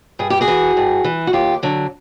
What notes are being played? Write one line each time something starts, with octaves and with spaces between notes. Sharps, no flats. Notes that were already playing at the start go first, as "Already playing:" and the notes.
G2 G#4
G4
F#4 G#4
E3
G2
E3
F#4
D#2 F4 G4
D3 F#3